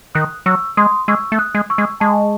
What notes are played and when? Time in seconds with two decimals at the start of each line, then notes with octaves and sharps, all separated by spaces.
0.15 D#3 D#6 F#6
0.46 F#3 C#6 E6
0.77 G#3 C6 D#6
1.08 G#3 C#6 E6
1.32 A3
1.39 D#6 F#6
1.55 G#3
1.70 C#6 E6
1.78 G#3
2.00 G#3 A5 C#6